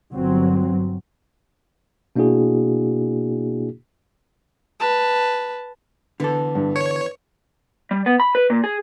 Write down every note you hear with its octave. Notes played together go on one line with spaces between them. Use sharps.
G1 F#3 C4
B2 A#3 D4 E4 F#4 G#4
B4 A5
D3 E3 B3 A4
G2
C#5 C#7
G3
B3
B5
B4
A#2
G#4